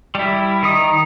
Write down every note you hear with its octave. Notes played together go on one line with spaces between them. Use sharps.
G3 E4
D#3 D#4 D#6